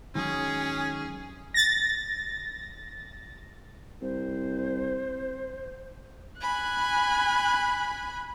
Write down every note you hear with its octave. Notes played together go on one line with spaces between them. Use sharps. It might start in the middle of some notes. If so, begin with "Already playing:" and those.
D#3 F#3 G#3 C#4 G#4
A6 A#6
C2 C5
G#5 B5 F#6